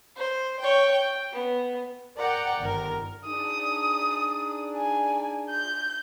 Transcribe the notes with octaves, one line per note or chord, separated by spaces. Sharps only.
C5
C#5 G5
G5
B3
A#4 D5 F#5 G5 A#5
G1 D#3 A#4
D4 D#4 G#4 D#6
G#5
G6